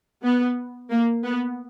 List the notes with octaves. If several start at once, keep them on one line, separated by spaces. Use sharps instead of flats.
B3
A#3
B3